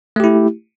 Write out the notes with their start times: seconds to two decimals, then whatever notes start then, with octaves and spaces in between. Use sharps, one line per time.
0.16 A3
0.20 G4
0.24 E4